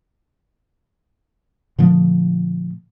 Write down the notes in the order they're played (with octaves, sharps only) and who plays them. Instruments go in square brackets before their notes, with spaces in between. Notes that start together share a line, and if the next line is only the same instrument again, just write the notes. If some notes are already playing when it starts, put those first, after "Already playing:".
[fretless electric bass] A#2 D3 F3 A3